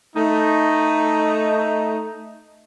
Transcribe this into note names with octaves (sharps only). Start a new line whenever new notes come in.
A3 D#4